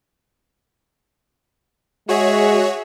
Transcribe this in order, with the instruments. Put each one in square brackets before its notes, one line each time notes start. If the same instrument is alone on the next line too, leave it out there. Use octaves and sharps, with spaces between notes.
[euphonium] G#3 [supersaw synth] F#4 C#5 [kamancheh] G#4 E5